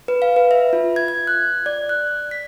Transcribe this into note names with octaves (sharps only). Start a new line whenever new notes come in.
B4
F5
B4
E5
F4
G#6
G#6
F#6
D5
F#6
B6